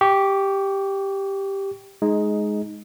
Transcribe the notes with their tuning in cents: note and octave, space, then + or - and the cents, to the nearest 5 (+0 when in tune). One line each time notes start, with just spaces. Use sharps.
G4 +0 C#6 +35
G#3 +10 D#4 +0